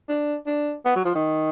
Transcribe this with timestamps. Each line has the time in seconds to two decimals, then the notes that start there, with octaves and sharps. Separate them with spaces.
0.09 D4
0.47 D4
0.85 B3
0.96 F#3
1.05 F3
1.15 D#3